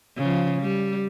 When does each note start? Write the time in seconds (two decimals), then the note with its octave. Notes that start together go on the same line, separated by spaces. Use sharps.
0.17 C#3 F3
0.61 G3